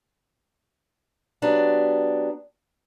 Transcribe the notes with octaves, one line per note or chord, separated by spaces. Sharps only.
F#3 B3 D4 G4